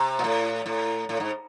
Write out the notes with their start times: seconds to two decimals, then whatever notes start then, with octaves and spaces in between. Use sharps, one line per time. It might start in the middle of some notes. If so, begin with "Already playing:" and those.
Already playing: C3
0.19 A#2
0.24 A2
0.66 A2
1.09 A2
1.20 G#2